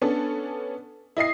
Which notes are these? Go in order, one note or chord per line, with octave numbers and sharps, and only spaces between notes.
B3 C#4 D4 A4
E4 D#5 D#6 C7